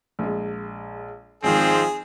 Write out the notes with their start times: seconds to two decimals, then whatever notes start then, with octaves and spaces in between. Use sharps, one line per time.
0.19 A#1 G#3
1.43 G#1 D#3 F3 G#3 C4 G#4